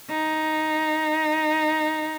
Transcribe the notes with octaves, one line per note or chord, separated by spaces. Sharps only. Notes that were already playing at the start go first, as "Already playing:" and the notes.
D#4